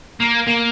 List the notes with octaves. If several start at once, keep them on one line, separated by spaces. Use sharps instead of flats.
A#3
A#3